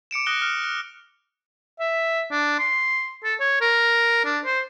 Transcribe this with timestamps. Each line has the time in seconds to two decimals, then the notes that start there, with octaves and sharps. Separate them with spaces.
0.11 D6 C#7 D7 E7
0.26 D#6 F#6 A#6 C#7 G7
0.42 F6
0.64 F#6
1.80 E5
2.31 D4
2.59 C6
3.24 A4
3.40 C#5
3.61 A#4
4.25 D4
4.45 C5